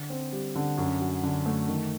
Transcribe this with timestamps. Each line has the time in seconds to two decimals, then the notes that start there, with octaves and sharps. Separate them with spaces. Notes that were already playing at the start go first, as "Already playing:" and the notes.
Already playing: D3
0.10 C4
0.32 G3
0.55 D3
0.78 F#2
1.01 F#3
1.23 D3
1.46 A3
1.68 D#3